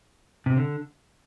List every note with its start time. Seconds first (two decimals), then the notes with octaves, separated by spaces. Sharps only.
0.46 C3
0.56 D3